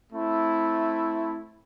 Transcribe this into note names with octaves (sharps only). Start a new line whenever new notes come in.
A3 C4 E4